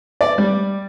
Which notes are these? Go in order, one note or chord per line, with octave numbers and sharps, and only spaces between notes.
D5
G3